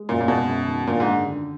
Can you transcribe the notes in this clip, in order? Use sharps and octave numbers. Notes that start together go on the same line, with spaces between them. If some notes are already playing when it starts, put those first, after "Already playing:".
Already playing: G#3
F#2 A#2
A#2
B2 G#3
F#2
D#3
A#2 D3
G#2
D4
D3